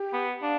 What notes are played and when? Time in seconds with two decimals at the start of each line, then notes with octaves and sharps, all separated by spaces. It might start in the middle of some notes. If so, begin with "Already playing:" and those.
Already playing: G4
0.13 B3
0.42 D4 F5